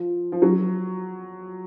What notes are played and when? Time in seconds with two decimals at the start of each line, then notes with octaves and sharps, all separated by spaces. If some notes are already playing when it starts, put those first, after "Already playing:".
Already playing: F3
0.32 F3
0.42 F#3